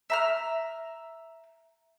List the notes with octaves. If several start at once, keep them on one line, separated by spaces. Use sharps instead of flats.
E5 A#5 F6